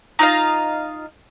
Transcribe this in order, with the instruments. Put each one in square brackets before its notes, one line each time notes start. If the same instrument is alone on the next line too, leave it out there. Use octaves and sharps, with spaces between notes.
[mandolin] D#4 F4 D#5 F5